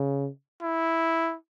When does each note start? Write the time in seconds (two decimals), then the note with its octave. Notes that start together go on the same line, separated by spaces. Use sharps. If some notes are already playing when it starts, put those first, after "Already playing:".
Already playing: C#3
0.62 E4